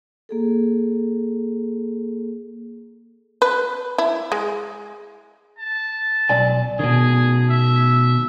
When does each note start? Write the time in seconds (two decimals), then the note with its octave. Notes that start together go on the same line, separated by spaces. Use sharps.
0.29 A#3 G#4 A4
3.42 B4
3.98 E4
4.32 G#3
5.59 A5
6.29 B1 D5 G#5
6.79 B2 D#3 G#4
7.51 E5